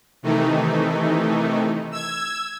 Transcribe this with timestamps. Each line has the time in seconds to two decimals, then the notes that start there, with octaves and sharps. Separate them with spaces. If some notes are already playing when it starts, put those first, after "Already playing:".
0.23 C3 D#3 E3 A3 D#4
1.92 E6 G#6